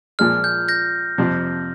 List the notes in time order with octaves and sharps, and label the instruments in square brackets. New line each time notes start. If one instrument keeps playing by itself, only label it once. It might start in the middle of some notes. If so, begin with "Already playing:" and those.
[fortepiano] A#2 F3 G#3 [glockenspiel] F6
[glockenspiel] G6
G6 A#6
[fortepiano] F2 C3 F3 C4